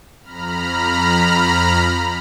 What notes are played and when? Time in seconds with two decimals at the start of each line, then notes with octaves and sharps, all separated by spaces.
0.23 F2 A#5 B5 F6